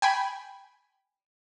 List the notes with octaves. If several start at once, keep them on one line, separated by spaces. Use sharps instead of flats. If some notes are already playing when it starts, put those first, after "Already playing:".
G5 G#5 B5